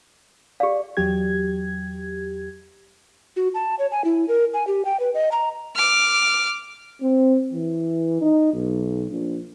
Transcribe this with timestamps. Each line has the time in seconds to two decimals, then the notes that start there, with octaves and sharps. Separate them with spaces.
0.60 G4 D5 F5
0.97 E2 F#3 G4 G#6
3.36 F#4
3.54 A5
3.79 C#5
3.92 G#5
4.04 E4
4.28 A#4
4.54 G#5
4.67 G4
4.85 G5
5.00 B4
5.14 D#5
5.32 A#5
5.76 D6 F6
7.02 C4
7.53 E3
8.21 D#4
8.54 B1
9.11 A#1